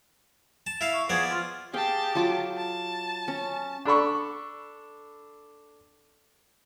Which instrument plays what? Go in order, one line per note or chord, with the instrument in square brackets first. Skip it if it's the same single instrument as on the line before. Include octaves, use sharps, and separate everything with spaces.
[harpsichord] A5
E4 F5
[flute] C#6
[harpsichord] F3 B3 D5 [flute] G#4
[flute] F4
[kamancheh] G4 A5 [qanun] G#4 F5 G5
[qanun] F#3 F4 D6
[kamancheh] A5
[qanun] C#4
[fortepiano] D4 A4 B5 C#6